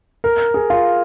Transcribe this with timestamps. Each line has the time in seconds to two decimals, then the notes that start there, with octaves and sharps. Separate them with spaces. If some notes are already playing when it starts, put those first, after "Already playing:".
0.24 A#4
0.54 G#4
0.70 F4